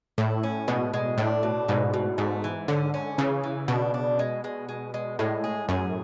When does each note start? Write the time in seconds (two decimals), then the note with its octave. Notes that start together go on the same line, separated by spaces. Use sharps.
0.18 A2 E4
0.43 C#4
0.68 B2 G#3
0.93 G#3
1.18 A2 D4
1.43 B2
1.68 G#2 B2
1.94 B2
2.18 G#2 A3
2.44 E3
2.68 D3 C#4
2.94 C#4
3.18 C#3 E3
3.44 E3
3.68 B2 D4
3.94 D4
4.19 G#3
4.44 G#3
4.69 G#3
4.94 G#3
5.19 A2 G#3
5.44 G#4
5.69 F#2 G#4